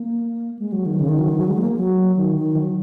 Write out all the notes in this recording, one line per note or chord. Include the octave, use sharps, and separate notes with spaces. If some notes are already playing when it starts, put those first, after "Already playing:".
Already playing: A#3
G#3
F#3
D#3
C#3
D#3
F#3
D#3
F#3
G#3
A#3
F#3
D#3
D#3
F#3